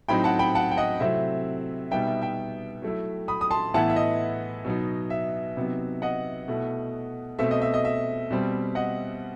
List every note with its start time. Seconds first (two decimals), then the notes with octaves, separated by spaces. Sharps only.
0.08 A2 F#3 C4 D#4 G5 B5
0.24 F#5 A5
0.39 G5 B5
0.55 F#5 A5
0.71 G5
0.77 D#5 F#5
1.00 C3 F#3 A3 C4 E4 E5
1.91 B2 G3 B3 D#4 E5 G5
2.07 E5
2.22 E5 G5
2.82 F#3 A3 E4
3.28 B5 D#6
3.41 D#6
3.51 A5 C6
3.74 A2 E3 B3 E4 F#5 A5
3.89 E5
3.96 D#5
4.65 B2 F#3 B3 D#4
5.10 E5
5.57 C3 F#3 B3 D#4
6.02 D#5 F#5
6.48 B2 A3 E4
7.39 B2 A3 C4 E5
7.51 D#5
7.62 E5
7.74 D#5
7.85 E5
8.31 B2 G3 C4
8.75 D#5 F#5